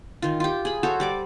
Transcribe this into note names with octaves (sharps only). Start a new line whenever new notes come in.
D#3 F4
F4 G4
G#4 B5
F#4 A4 C5 C#5
G3 D5 D6